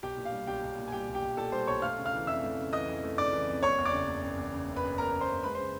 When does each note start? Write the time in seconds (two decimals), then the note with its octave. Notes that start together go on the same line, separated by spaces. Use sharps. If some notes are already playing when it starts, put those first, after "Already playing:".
0.03 B1 G4 G5
0.17 A#2
0.25 F5
0.32 G3
0.47 B1 G4 G5
0.63 B1
0.78 A#2
0.88 G#5
0.92 G3 G4 G5
1.08 B1
1.15 G4 G5
1.22 B1
1.37 A#2 A4 A5
1.52 G3 C5 C6
1.67 B1 C#5 C#6
1.82 A3 F5 F6
1.98 C#3
2.05 F5 F6
2.13 E3
2.27 F2 E5 E6
2.43 A3
2.58 C#3
2.73 E3 D#5 D#6
2.88 F2
3.04 A3
3.17 C#3 D5 D6
3.33 E3
3.48 F2
3.63 F#1 C#5 C#6
3.78 E2
3.85 D5 D6
3.93 C#3
4.08 F#1
4.23 F#1
4.38 E2
4.53 C#3
4.69 F#1
4.76 B4 B5
4.84 F#1
4.98 E2 A#4 A#5
5.13 C#3
5.21 C5 C6
5.28 F#1
5.43 G#3 B4 B5
5.55 C5 C6
5.59 C#3